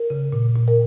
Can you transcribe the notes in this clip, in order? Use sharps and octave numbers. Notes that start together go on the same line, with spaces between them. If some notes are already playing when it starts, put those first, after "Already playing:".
Already playing: A#4
C#3
A#2
A#2
A#4